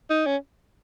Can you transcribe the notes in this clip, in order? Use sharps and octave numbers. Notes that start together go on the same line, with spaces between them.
D#4
C#4